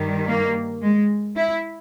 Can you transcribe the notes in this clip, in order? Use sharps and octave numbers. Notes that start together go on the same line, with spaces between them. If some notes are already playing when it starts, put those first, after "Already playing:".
Already playing: G2 D#3 G3
A#3
G#3
E4